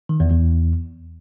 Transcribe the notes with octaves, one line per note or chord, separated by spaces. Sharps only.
D#3
E2
E2